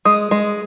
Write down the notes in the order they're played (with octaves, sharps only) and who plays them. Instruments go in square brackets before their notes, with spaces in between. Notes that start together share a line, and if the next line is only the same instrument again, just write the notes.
[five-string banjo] G#3 [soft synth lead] D#6
[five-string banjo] G#3